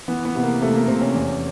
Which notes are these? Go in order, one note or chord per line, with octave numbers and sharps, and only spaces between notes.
E3 B3
B3
C3 B3
A#3
C3 A3
A#3
C3 C4
C#4
E2